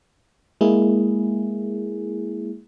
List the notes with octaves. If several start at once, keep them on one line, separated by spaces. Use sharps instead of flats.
G#3 A#3 E4 G#4